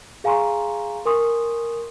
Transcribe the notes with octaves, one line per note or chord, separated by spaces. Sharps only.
G#4 F5 G#5 A#5 C6 C#6
A#4 G#5 C6 C#6 D#6